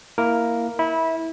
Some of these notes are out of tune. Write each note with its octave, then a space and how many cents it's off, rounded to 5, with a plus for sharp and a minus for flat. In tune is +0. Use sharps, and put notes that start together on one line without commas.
A#3 +0 E4 +0 A#4 +0
E4 -20 B5 -10